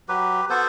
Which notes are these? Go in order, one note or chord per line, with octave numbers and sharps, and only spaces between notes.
F#3 G4 B4
B3 F#4 A4 C5